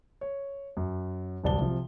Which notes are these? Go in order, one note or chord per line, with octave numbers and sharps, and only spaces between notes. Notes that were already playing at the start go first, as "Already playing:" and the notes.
C#5
F#2
D1 C2 D5 A5 G7
C3 F3